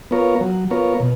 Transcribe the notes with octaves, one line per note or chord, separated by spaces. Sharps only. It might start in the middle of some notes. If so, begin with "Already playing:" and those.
B3 F4 A#4 C#5
F#3
B3 F4 A#4 C#5
B2